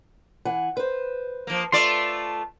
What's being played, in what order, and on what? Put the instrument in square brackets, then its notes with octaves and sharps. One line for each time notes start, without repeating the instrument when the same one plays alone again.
[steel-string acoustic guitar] E3 F#5 G#5
B4 C5
[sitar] F3 A#3
[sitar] A3 F4 D5 [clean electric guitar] C6